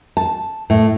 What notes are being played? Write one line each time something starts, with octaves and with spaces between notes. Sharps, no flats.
A5
A2